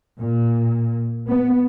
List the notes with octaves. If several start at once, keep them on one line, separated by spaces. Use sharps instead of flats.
A#2
B3